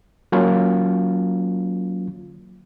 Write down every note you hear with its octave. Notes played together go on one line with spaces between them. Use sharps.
F#3 A#3 C#4 F4